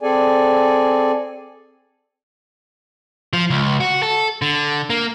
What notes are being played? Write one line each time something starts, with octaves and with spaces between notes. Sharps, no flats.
C4 G#4 A4 D5 G#5
F3
C#2
F#4
A4
D3
A#3